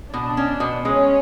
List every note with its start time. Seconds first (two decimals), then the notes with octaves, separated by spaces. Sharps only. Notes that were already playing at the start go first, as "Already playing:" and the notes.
0.14 B2 D4
0.37 C#4
0.60 B2
0.85 G#3 C#4